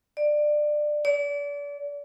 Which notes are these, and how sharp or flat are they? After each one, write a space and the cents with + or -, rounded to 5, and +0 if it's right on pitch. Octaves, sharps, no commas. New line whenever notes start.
D5 +20
D5 -35